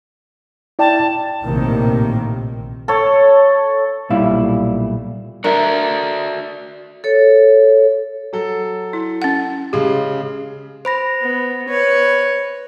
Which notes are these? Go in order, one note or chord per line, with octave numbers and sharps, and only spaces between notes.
E4 D5 G5 A5
A#1 A2 C3 D#3 A#3
A4 C#5
B1 A#2 G3 E4 F5
D4 F#4 A#4 D5 E5
A4 C#5
F#3 A4
E4
C#4 F#5
C#3 G#3 G4
C5 B5 A#6
B3
B4 C#5